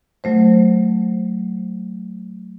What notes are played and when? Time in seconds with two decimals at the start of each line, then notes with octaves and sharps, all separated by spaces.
0.24 F#3 A3 C5